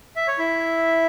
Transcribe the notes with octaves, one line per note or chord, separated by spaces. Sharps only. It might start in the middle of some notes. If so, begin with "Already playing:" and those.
E5
C#5
E4 E5